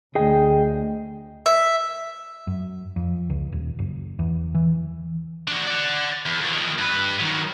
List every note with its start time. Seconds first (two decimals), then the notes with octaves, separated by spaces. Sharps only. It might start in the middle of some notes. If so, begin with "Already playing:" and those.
0.15 D2 G#4 D#5 G5
1.46 E5
2.47 F#2
2.96 F2
3.30 C#2
3.52 D#1
3.79 F#1
4.19 E2
4.55 E3
5.48 D4 F#4
5.67 D5 F#5
6.26 E2
6.41 F2 D#3
6.78 G2 B4
7.20 D#3 F#3